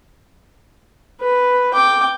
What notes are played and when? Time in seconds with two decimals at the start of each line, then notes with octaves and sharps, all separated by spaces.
1.21 B4
1.74 G5 D6